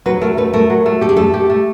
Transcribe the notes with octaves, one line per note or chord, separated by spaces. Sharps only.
F#3 B4
A3 A#4
A3 B4
A3 A#4
F#3
A3
G4 A4
G#4
A3 A4
G4
A3